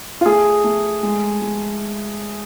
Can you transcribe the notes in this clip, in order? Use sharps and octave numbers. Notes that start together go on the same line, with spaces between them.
F4
A3 G#4
A3
G#3
G#3